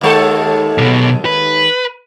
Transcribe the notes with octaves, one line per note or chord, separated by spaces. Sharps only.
D#2 G#3 A4
B1 B2
B4